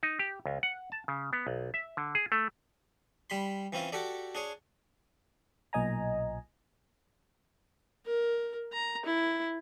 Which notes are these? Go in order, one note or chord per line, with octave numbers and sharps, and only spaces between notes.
D#4
G4
C#2
F#5
A5
C#3
B3
B1
E5
D3
G#4
A3
G3 B5 C6
E3 C4 C#4 F4
F#4 G4 A4 D5
D4 G#4 C#5
B1 A#2 D#5 G#5 A#5
A#4
A#5
E4